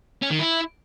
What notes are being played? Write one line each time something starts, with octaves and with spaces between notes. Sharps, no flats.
C#4
D#3
E4